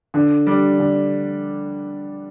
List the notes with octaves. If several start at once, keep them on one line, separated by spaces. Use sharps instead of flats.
D3
G3 D4
D3